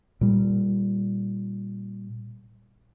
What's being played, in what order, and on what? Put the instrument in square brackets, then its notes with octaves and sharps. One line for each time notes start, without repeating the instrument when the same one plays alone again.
[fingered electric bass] A#2 G3